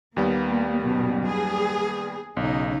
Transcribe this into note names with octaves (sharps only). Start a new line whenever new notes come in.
D#2 G3 A#3 B3
F#2 B2
G#4
B1 C#3 D#4